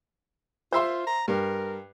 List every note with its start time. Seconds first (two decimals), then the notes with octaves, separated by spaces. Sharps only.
0.72 F4 C5 E5 C6
1.07 A#5
1.28 G2 A#4